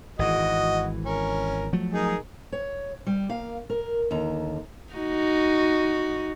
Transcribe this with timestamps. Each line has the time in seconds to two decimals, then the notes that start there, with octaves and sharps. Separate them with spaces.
0.19 G#1 E3 F#4 D#5
1.06 C#4 A#4
1.73 F3 F#3 A3
1.93 D#4 G#4 A#4
2.52 C#5
3.07 G3
3.29 A#3 F5
3.70 A#4
4.11 D#2 D3 A#5
4.93 D#4 F#4